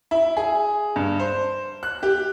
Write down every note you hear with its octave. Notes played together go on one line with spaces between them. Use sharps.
E4
G#4
G2
C5
F#6
G4